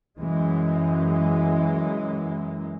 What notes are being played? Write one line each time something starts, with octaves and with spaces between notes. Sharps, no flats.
F#2 E3 G#3